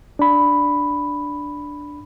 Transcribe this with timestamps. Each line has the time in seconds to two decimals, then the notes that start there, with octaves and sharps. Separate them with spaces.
0.19 D4 B5